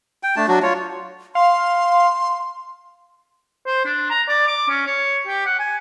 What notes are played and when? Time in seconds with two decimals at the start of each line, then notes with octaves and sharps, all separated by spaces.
0.23 G5
0.36 A3 D4 A5
0.48 F#3 D4 F#4
0.62 F4 C#5
1.35 F5 C6
3.67 C5
3.85 D4
4.10 A#5
4.28 D5
4.47 D6
4.69 C#4
4.86 C#5
5.27 G4
5.46 F#5
5.59 G#5